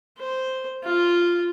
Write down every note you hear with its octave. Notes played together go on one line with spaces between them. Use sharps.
C5
F4